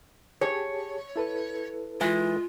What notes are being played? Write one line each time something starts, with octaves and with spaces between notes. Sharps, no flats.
G4 G#4 C#5 A5
E4 A4 B4
E3 G#3 F4